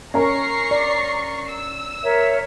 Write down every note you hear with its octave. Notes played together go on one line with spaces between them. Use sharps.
C#4 A#4 A#5 C#6 C7
D5
E6
A#4 C#5 E5